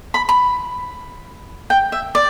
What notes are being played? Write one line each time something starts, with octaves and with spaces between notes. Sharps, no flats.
B5
B5
G5
E5
D5